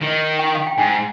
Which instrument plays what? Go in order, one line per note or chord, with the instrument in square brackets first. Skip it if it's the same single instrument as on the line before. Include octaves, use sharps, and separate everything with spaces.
[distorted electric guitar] D#3
[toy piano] G5
F5
G5
[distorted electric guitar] G#2 [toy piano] G#5